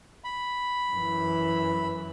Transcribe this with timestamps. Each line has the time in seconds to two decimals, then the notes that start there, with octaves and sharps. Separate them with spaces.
0.24 B5
0.91 F#2 E3